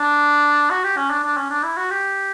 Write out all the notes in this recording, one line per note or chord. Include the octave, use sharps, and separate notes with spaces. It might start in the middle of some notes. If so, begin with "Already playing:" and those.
Already playing: D4
F#4
G4
C#4
D4
D4
C#4
D4
E4
F#4
G4